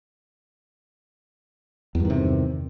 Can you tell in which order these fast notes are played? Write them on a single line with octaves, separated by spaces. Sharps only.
E2 G2 D#3 C3